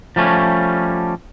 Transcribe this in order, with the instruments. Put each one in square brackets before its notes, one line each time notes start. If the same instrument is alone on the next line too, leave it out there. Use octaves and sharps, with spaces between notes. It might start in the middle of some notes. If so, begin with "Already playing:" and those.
[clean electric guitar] F3 G3 A3 C#4